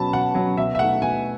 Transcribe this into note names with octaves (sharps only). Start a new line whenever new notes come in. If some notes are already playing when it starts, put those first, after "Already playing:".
Already playing: B2 F#3 C#4 A5 B5
B2 F#5
F#3 C#4
B2 E5
E5
A3 D#4 F#5
B2 G#5